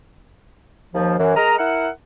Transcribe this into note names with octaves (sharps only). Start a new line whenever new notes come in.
D#2 F3
F#2 E3
G#3 A#4 D#5 A#5
E4 A#4 F#5